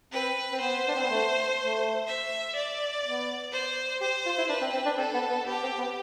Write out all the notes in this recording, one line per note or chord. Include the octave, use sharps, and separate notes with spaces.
C4 B4
C4
B3 C5
D4
C4
B3
A3
A3
E5
D5
B3
C5
G4 C5
F4
E4
D4 B4
C4
C4
D4
C4 A4
B3
B3
B3 G4
C4
B3